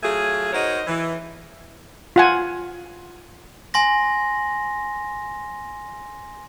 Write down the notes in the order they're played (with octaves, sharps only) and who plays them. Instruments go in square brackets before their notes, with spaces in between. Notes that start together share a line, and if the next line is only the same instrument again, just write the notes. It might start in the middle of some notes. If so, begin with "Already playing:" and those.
[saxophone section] F#3 A3 F4 G#4
D#4 F#4 A#4 C5 C#5 D#5
E3
[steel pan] F4 F#5 G#5
[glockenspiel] G#5 C6 A#6